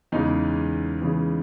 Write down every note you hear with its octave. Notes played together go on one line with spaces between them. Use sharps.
E2 C#3 E3 G#3 D#4
E2 C#3 E3 G#3